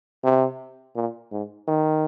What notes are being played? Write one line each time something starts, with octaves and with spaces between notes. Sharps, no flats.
C3
A#2
G#2
D#3